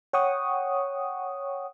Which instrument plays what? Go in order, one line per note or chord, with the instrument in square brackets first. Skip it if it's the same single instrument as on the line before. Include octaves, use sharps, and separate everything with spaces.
[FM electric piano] C#5 F#5 G5 C#6 D#6